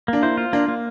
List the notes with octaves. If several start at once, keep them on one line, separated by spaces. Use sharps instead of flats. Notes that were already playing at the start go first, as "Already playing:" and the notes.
A#3 D4
E4 C5
F4
A#3 D4
A#3